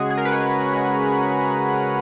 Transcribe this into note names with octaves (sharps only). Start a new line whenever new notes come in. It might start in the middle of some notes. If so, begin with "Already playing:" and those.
Already playing: C#3 G#3 F#4 G#4
G#4
A#4
B4
G#3 C#5
G#3